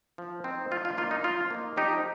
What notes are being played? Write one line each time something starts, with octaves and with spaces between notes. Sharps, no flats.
F3
C4 D#4
F3 F4
F4
A#3 D#4 F4
D#4
F3 F4
A#3 D#4
F3 D#4 G4